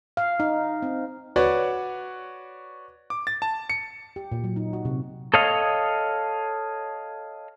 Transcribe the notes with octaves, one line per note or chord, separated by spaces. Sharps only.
F5
D#4
C4
F#4 B4 C#5 D5
D6
A6
A5
C#7
G4
A#2
F#3
D#4
F#4
C3
A4 C#5 D#5 F5